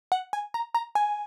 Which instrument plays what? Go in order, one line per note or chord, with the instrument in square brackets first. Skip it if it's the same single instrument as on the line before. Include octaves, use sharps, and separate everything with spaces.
[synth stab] F#5
G#5
A#5
A#5
G#5